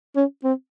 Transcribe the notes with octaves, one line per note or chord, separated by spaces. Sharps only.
C#4
C4